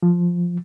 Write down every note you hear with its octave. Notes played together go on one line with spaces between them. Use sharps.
F3